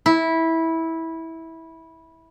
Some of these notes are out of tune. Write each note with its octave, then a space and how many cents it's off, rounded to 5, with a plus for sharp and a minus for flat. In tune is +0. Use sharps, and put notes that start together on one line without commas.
E4 -15